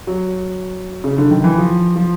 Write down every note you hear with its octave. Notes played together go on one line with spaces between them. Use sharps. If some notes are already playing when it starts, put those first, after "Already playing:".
F#3
C#3
D3
D#3
E3
F3
F3